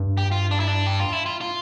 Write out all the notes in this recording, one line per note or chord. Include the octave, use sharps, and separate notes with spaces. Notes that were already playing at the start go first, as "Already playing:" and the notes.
Already playing: G2
G4
F4
D4
E4
D4
G4
F4
E4
F4
F4